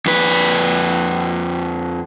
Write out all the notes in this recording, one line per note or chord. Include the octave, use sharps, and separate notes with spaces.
F2 B4